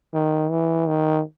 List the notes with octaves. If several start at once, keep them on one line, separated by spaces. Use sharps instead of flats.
D#3
E3
D#3